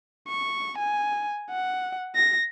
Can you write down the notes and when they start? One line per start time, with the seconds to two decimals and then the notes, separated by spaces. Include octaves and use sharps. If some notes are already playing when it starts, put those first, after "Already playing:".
0.28 C#6
0.78 G#5
1.51 F#5
2.16 A#6